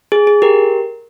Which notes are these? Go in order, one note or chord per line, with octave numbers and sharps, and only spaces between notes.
G#4
G#4
G4 A#4